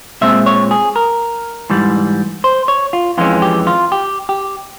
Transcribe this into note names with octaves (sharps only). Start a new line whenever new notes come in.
A#2 G#3 C4 E5
C#5
G#4
A#4
G#2 E3 G3
C5
C#5
F4
F2 E3 G#3 C#4 F4
G4
F4
G4
G4